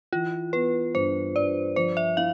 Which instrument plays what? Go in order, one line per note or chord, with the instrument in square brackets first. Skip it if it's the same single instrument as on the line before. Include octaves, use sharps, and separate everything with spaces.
[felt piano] E3 [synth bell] F4
[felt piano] B3 [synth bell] B4
[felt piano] G2 [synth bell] C5
[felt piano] G2 [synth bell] D5
[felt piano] F3 [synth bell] C5
[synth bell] E5
[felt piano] E4 [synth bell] F5